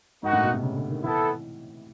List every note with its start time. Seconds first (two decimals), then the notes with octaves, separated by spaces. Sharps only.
0.23 G#2 A#3 D#4 F#4
0.33 A2
0.43 B2
0.53 C3
0.63 C#3
0.76 D3
0.90 D#3
1.02 E3 B3 E4 A4